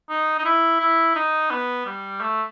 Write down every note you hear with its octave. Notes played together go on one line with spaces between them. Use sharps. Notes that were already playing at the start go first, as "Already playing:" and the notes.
D#4
D#4
E4
E4
D#4
B3
G3
A3